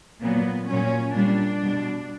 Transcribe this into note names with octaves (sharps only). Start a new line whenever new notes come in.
A#2 F#3 B3
A#2 F#3 C#4
A#2 G3 D4
B2 G3